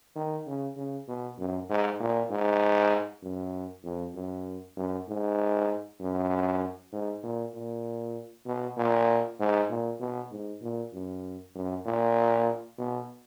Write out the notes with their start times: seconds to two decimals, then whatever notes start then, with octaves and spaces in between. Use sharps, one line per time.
0.16 D#3
0.46 C#3
0.76 C#3
1.08 B2
1.39 F#2
1.70 G#2
2.00 A#2
2.30 G#2
3.23 F#2
3.84 F2
4.15 F#2
4.77 F#2
5.08 G#2
6.01 F#2
6.92 G#2
7.23 A#2
7.54 A#2
8.46 B2
8.77 A#2
9.39 G#2
9.70 A#2
10.00 B2
10.31 G#2
10.62 A#2
10.93 F#2
11.55 F#2
11.86 A#2
12.78 B2